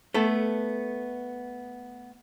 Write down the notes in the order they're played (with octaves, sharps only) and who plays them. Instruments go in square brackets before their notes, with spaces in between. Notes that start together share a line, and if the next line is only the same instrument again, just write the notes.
[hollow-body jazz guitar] A3 B3 A4